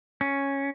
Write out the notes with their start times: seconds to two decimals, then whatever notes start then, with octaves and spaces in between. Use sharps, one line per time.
0.21 C#4